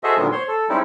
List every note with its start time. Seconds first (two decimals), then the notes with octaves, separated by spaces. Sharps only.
0.03 F#4 G#4 A4 C5 D#5 E5
0.17 A#2 D3 D#3 F#3 G#3 B3
0.32 C5 C#5 C6
0.48 A4
0.69 G3 G#3 C4 C#4 D#4 E4